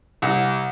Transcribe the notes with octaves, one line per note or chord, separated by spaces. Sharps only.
C2